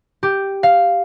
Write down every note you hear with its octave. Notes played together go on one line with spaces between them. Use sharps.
G4
F5